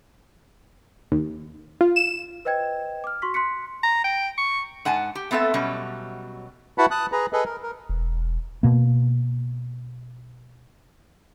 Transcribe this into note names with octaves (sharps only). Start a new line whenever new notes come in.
D#2
F4
E7
B4 C5 D#5 G5 G#6
D6 F6
F#4 C6 C#6 B6
C6 F#6 B6 C#7
A#5
G5
C#6
G#2 F#5 G#5 A5
G4
A3 B3 C4 A4 E5
B2 F#3 G3 C#4
E4 F#4 B4 F#5 A5 B5
A5 D#6 F#6
G#4 B4 A#5
G#4 A4 B4 D#5
A#4
A#4
E1
B2 A#3